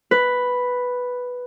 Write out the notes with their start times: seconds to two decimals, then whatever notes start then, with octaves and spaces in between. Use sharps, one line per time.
0.11 B4